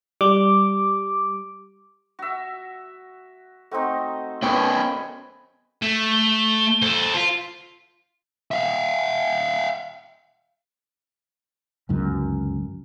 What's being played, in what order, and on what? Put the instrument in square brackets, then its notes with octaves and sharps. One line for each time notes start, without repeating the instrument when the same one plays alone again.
[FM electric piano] G3 D6
[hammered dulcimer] F#4 E5
[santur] A3 C4 D#4 [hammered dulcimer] F#4
[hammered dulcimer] F#2 B4 G#5 [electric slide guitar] B3 C#4 [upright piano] G5 C#6
[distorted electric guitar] A3
[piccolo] G7
[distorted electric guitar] A4 C5
[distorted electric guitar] F4 [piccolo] B6
[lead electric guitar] E5 F5
[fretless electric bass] G1 C#2 F#2